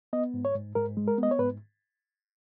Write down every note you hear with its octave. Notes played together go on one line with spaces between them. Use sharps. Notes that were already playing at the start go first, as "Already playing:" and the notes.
B3 D#5
G#2
C#5
G#2
G#2 A#4
G#3
A#4
B3 D#5
C#5
G#2 B4